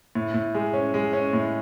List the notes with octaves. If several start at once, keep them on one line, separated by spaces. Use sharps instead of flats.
A2
A2
G#3
C#4
G#3
C#4
A2